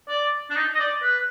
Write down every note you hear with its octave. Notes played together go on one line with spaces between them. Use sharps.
D5
D4
D#4
D#5
D5
B4